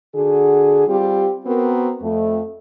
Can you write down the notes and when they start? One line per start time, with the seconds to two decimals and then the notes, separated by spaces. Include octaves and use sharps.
0.16 D3 F#4 G#4
0.88 G3 C4 F4 G4
1.46 B3 C4 F#4 A#4
2.02 F2 A3